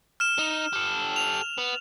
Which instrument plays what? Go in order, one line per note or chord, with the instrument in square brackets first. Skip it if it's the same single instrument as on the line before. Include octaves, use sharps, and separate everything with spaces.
[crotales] F6 E7
[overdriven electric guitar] D#4
G4 A4
[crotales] F7
[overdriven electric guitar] B3